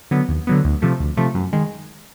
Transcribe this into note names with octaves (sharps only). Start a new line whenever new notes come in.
D3 F#3 B3
D#2
D3 F#3 B3
D2
C3 F3 A3
D2
C3 F3 A3
F#2
D#3 G#3